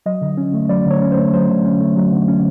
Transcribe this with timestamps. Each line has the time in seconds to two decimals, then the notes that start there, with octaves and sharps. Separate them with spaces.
0.06 F#3 D#5
0.22 D3
0.37 C#4
0.54 A3
0.69 F#3 D5
0.86 D3 C#5
1.02 C#4
1.12 C5
1.17 A3
1.33 F#3 C5
1.49 D3
1.65 C#4
1.80 A3
1.97 F#3
2.13 D3
2.28 C#4